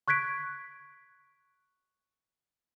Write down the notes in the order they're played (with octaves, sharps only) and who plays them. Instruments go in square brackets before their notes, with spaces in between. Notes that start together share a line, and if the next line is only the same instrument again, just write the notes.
[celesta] C#6 F#6 G#6 B6 D7